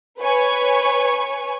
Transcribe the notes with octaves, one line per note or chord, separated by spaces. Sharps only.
B4 C#5 G#5 C#6